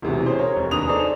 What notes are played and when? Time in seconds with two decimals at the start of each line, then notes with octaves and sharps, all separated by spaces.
0.02 E1 A1 C3 E3 F#4
0.26 C#4 G#4 C5
0.39 A#4 C#5
0.56 F1
0.71 D#2 D4 B4 A#5 D#6 F7
0.86 D#4 G#4 A4 C5 D5